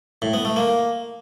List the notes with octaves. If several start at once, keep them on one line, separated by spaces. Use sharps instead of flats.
A2
B3
A3
A#3